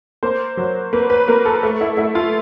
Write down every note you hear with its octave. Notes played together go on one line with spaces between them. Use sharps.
A#3 C5
F#3
A#3 B4
B4
A#3 A#4
A4
A3
E4
A3 E4
F4